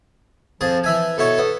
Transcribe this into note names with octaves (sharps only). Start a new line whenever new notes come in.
F2 F3 G#4 A5
E3 E5 G#5
B2 E4 A4 C#5
B3